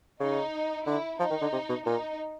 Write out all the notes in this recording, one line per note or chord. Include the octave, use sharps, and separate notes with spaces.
C#3 D#4
D3 E4
F3 D#4
D#3
D3
C3
B2
A#2 D#4